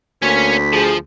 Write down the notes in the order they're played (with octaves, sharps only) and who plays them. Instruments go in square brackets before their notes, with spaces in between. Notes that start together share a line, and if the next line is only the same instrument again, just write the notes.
[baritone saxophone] D2 [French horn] A#3 [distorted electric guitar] C#4 C#5 [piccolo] B6
[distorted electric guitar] F3 [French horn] G#4